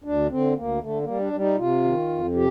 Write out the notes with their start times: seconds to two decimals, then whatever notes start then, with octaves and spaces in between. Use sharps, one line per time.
0.04 D2 D4
0.30 D3 C4
0.56 D2 A#3
0.81 D3 A3
1.01 A#3
1.07 G3
1.19 D4
1.33 G3
1.39 D#4
1.57 C3 F4
1.84 D#3
2.09 F2
2.35 C3 G4